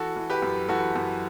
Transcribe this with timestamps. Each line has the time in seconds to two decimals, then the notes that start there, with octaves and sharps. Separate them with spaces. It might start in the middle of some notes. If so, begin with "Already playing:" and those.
Already playing: E3 F#4 A4
0.16 E3
0.30 G4 B4
0.42 F#2
0.69 E3 F#4 A4
0.96 F#2